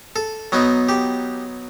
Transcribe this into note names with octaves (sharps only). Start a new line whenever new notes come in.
A4
F#3 B3 D#4
G4